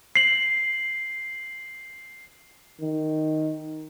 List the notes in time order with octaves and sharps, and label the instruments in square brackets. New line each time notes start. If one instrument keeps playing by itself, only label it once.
[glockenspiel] C7 F#7
[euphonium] D#3